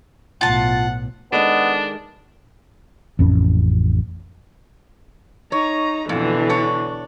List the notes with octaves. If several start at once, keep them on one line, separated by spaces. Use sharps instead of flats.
B1 A2 F4 F#5 A5
D#3 G#3 B3 D4 A4
A1 F2 C#4
D#4 C#5 A#5
F2 B2 D3 E3
D4 C#5